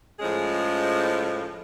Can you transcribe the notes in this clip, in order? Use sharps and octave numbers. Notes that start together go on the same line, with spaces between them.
A2 F3 G#3 C#4 G#4